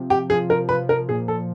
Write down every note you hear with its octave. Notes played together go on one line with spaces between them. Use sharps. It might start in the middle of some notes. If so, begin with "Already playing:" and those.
Already playing: C3 F3
G4
F3 G#4
A#4
F3 B4
A#4
A#2 G#4
A4